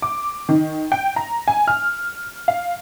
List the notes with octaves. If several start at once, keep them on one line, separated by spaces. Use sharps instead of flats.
D6
D#3
G5
A#5
G#5
F6
F5